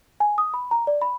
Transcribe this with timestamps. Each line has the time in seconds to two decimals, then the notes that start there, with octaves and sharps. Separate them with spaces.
0.20 G#5
0.38 D#6
0.54 B5
0.71 A#5
0.87 D5
1.01 B5